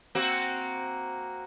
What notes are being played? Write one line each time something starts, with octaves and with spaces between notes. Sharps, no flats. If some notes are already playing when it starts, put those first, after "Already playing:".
A#3 C4 F#4